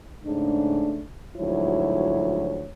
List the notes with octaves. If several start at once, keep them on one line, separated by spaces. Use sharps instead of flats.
G#2 C#3 A3 D4
D2 G#2 F3 F#3 E4 C#5